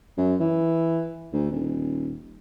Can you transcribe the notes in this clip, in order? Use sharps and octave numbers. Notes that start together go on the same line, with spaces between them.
F#2
E3
D2
D#1